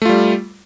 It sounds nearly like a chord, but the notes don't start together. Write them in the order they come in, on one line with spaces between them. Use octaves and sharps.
A3 F4 G3